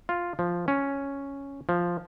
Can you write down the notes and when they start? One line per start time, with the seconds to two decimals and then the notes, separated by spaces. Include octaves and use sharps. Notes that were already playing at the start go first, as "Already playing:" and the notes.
0.09 F4
0.39 F3
0.68 C#4
1.69 F3